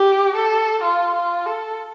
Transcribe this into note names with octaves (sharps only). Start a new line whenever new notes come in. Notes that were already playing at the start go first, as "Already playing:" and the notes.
Already playing: G4
A4
F4
F4
A4